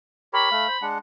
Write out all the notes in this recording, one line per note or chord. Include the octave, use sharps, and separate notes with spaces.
G4 A#4 C#5 B5
A3 F5
C5
G#3 D4 F#5